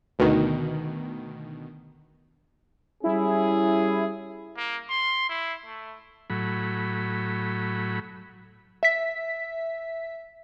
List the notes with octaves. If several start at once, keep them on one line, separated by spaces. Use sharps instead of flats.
D2 B2 D#3
G3 C#4 E4 G#4
A#3
C6
E4
A3
A2 F#3 B5
E5 B6